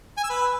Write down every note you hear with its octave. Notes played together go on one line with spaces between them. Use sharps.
G#5
E6
B4